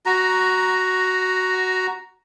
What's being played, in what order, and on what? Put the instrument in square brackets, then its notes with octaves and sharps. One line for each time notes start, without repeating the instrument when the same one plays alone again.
[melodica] F#4 A#5